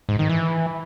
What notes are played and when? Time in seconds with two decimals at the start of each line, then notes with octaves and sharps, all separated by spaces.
0.09 G#2
0.19 D#3
0.29 E3